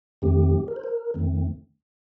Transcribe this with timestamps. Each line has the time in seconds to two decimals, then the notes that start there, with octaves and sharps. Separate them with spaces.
0.22 F2 D#3 A3 C4 G4
0.68 A#4
0.76 C5
0.84 A#4
1.14 F2 D#3 A3 C4